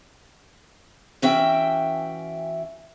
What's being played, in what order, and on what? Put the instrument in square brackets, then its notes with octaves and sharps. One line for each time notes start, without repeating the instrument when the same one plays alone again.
[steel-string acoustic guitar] E3 C#4 F#4 E5 G5